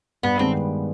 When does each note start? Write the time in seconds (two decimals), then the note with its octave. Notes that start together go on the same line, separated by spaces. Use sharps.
0.23 G2 B3
0.39 D#3 G#3 B3 C4